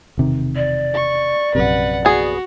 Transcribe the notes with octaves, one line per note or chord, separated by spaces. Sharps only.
E1 C3 D#3
D5
C#6
A#1 F#2 C3 B4 F#5
B3 F#4 G#4